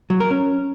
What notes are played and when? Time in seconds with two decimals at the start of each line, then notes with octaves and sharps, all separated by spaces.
0.10 F#3
0.20 A#4
0.31 C#4